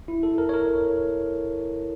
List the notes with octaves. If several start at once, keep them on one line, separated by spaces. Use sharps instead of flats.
E4
A4
A#4
C#5
A#4